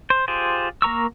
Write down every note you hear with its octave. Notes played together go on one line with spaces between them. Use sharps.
C5
F4 G4 G#4 C5
A#3 A#4 A#5 C#6 E6